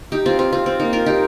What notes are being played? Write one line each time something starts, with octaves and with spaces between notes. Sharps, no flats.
D#4 G4
C4 F4
C4 F4
C4 F4
C4
A#3 D#4
F4 A#4
D#4 G4